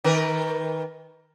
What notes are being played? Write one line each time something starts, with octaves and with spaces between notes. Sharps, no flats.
D#3 A#4 B4